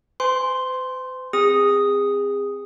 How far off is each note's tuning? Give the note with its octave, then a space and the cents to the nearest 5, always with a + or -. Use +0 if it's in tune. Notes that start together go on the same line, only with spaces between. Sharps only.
C5 -45 G#5 +0 C6 +0
C4 +0 G#4 -30 D#6 +0